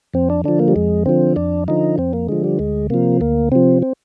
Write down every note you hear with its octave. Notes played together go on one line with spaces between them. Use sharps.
F2 C4
D4
D3 F3 D4
A#3
G3
F2 G#3
D3 F3 C4
F2 D4
D3 F3 D#4
F2 C4
A#3
D3 F3 G#3
G3
D2 G#3
C3 F3 A#3
D2 A#3
C3 F3 C4
C4